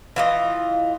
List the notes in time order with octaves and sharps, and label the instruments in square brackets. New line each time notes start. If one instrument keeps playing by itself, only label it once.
[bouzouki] E3 F4 D#5